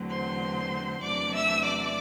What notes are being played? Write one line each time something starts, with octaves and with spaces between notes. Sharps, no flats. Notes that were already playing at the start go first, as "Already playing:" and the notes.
Already playing: E2 D3 F#3 A3 C4
C5 C6
E2 C3 F#3 A3 D4 D5 D6
E5 E6
D5 D6